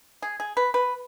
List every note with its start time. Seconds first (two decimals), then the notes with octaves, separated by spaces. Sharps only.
0.22 G#4
0.40 G#4
0.57 B4
0.74 B4